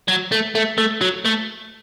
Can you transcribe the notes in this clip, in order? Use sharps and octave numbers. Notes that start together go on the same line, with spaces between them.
F#3
A3
A3
A3
F#3
A3